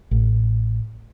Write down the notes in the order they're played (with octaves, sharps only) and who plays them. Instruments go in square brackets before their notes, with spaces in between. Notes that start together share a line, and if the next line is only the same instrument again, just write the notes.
[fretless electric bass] A1